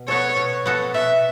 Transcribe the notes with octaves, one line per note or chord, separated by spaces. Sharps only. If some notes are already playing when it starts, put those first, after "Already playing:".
Already playing: B2
B3 F#4 A4 C#5
B2
B3 F#4 A4
B2 E5